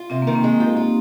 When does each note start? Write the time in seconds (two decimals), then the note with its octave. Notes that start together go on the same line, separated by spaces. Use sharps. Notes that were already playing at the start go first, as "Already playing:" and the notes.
Already playing: F4
0.10 C3 C4
0.22 A#3
0.27 D#3
0.35 C4
0.44 G#3 D#4
0.60 F4 G4
0.77 F4